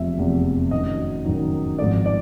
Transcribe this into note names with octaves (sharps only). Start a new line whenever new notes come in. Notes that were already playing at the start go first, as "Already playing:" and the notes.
Already playing: F1 E2 C3 F3 E5
F1 E2 C3 F3
F#2 D#3 F#3 D#5
F#2 D#3 F#3
G#1 G#2 F3 A3 D5
D5